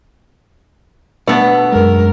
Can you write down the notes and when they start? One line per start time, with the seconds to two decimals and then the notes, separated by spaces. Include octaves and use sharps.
1.28 B2 A3 B3 D4 F#5
1.72 F#2 G#3 A#4